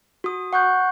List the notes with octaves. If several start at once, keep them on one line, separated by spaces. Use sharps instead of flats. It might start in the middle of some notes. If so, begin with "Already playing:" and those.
F#4 D#6
F#5 C#6 F#6 G6